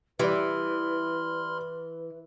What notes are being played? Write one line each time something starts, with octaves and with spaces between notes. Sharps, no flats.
E3 G3 B4 D5 B5 C6 F6